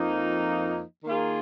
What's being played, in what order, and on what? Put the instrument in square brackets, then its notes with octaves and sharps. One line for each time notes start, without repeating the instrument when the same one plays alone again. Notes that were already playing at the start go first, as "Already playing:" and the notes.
Already playing: [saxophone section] F2 F3 A#3 D#4
D#3 A#3 F4 G#4